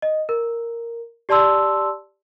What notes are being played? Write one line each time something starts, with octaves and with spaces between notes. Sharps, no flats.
D#5
A#4
G4 D5 A5 C6 E6